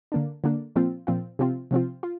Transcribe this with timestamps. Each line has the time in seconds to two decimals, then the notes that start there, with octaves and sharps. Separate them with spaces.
0.12 D3 A#3 D4
0.44 D3 A#3 D4
0.76 A#2 F3 C4 F4
1.07 A#2 F3 C4 F4
1.39 C3 F3 C4 F4
1.71 C3 F3 C4 F4
2.03 F4